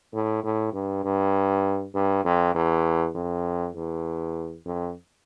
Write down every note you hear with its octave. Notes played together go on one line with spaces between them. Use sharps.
A2
A2
G2
G2
G2
F2
E2
F2
E2
F2